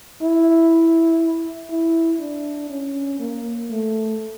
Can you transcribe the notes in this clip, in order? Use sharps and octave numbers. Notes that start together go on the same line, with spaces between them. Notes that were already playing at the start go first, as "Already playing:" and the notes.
E4
E4
D4
C#4
A#3
A3